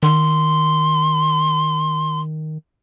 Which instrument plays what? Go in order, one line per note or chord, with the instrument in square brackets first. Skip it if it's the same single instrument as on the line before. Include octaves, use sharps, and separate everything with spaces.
[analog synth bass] D#3 [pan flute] C6